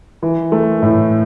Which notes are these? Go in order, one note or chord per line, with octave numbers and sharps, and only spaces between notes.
E3
A3
A2